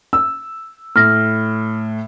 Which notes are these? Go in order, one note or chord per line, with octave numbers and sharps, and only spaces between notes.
E6
A2 F6 A#6